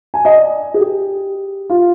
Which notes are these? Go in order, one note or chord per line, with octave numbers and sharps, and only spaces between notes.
G#5
D#5
D5
G#4
G4
F4